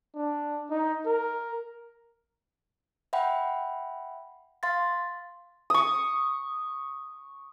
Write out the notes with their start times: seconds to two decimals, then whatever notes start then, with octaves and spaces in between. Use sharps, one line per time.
0.15 D4
0.70 D#4
1.06 A#4
3.13 E5 F#5 G5 B5
4.63 F5 C6 A6
5.70 C#6 D#6